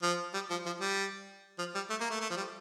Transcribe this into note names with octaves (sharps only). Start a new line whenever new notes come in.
F3
G3
F3
F3
G3
F3
G3
A3
A#3
A3
A3
F3
G3